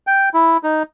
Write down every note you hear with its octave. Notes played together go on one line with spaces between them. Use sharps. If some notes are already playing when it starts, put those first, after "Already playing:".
G5
E4
D#4